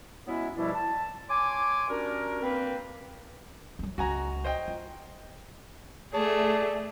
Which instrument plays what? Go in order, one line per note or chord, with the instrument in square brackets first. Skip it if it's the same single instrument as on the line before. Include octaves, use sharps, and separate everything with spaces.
[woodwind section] F#3 G#3 B3 C#4 E4
G2 B2 F3 G3 D4 E4
A5
C#5 G#5 C6 D6
G3 C#4 D4 F#4 A#4
A#3 C4 B4
[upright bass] F#3 A3
[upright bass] C#2 [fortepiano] F#4 G#5 A#5
[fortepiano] C5 D#5 G5
[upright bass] F4
[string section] A3 [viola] G#4 [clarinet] D5 [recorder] A5